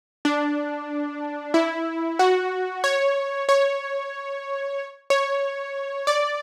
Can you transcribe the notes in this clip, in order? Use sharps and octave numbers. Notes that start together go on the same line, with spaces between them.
D4
E4
F#4
C#5
C#5
C#5
D5